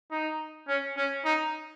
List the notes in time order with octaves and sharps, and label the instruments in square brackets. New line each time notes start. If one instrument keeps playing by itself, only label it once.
[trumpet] D#4
C#4
C#4
D#4